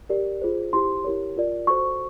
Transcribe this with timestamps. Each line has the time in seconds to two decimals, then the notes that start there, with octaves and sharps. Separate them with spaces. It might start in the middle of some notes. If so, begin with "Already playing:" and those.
0.09 G4 A#4 D5
0.42 F4 G#4 C5
0.73 E4 G4 C5 C6
1.04 E4 G4 A#4 C#5
1.36 F4 A#4 D5
1.67 F#4 A4 C5 C#6